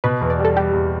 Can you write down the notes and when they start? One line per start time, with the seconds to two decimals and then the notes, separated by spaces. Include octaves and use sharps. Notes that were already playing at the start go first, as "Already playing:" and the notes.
0.04 B2 B4
0.21 E2
0.30 D5
0.39 G3
0.45 A4
0.56 G3 G4
0.73 E2